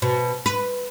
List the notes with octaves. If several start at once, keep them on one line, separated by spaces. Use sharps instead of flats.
B2
B4